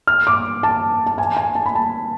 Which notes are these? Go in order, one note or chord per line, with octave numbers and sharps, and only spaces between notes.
F6
D6
A5
A5
G#5
G#5
A5
B5
A5